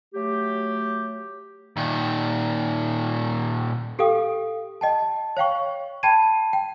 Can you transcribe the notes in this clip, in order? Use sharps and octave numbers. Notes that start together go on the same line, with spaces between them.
F#3 A3 G4
A#2 D#3
G4 A4 F5 G5 D#6
D#5 G5 A5
C#5 F5 G5 C#6
G5 A5 B5 G#6 D#7
G5